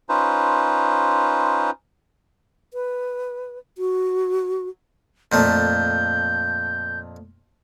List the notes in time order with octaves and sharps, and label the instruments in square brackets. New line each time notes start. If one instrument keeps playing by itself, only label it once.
[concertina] C#4 D#4 F4 B4 C5
[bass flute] B4
F#4
[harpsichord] F2 A#2 A3 [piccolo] G6